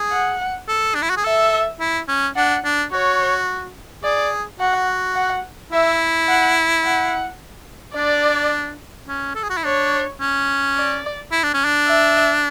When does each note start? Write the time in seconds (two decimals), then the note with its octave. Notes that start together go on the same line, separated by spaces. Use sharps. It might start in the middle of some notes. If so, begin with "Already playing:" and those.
Already playing: G#4
0.12 F#5
0.68 A4
0.95 D4
1.03 E4
1.10 F#4
1.17 G#4
1.24 A4 E5
1.80 E4
2.08 C#4
2.36 D4 F#5
2.65 D4
2.92 F#4 C#5
4.04 G#4 D5
4.60 F#4 F#5
5.16 F#5
5.72 E4 E5
6.28 F#5
6.84 F#5
7.96 D4 D5
9.08 C#4
9.35 A4
9.43 G#4
9.50 F#4
9.57 E4
9.64 D4 C#5
10.20 C#4
10.77 D5
11.32 E4
11.43 D4
11.54 C#4
11.65 D4
11.88 E5